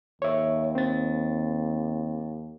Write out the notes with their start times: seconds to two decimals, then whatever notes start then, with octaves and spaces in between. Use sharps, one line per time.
0.22 D#2 C#5 E5
0.75 C4 A6